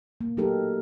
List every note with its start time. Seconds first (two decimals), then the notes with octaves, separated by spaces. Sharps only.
0.21 A#3
0.37 F#3 A3 D#4 G4 A4 A#4